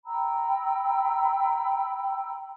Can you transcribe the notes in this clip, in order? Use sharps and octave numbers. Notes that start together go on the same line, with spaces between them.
G5 A#5 B5 E6